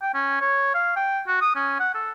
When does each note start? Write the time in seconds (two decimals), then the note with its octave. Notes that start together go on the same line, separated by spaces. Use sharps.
0.02 G5
0.14 C#4
0.41 C#5
0.74 F5
0.96 G5
1.27 F#4
1.41 D#6
1.55 C#4
1.80 F#5
1.94 A4